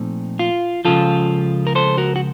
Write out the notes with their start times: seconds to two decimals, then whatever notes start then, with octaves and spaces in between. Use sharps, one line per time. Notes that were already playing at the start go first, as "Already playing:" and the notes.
Already playing: A#2 F3 A3 C4 D#4
0.39 F4
0.85 C#2 C#3 F3 F4 A4
1.67 A#4
1.75 A4 C5
1.97 F#4 A#4
2.16 F#4